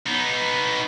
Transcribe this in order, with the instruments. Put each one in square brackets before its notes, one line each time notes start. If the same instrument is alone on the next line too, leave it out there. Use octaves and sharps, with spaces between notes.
[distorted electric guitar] B3 D#4